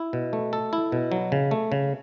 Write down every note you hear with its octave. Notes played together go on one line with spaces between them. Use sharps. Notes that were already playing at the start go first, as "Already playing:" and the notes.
Already playing: E4
B2
A3
A4
E4
B2
F#3
C#3
A3
C#3